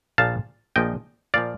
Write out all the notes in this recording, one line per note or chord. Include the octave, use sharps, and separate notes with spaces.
A#1 A#2 F3 F5 A5
A#1 A#2 F3 D#5 G5
A#2 F3 D5 F5